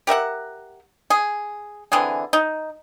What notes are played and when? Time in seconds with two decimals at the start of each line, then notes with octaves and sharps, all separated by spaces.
0.07 G4 A#4 E5 F#5
1.10 G#4
1.92 D3 E3 C4 G#4
2.33 D#4